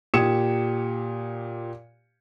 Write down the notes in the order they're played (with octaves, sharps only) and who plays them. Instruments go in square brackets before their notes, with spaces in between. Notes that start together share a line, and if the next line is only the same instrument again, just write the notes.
[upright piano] A#2 G4 D#6 G#6 C#7 E7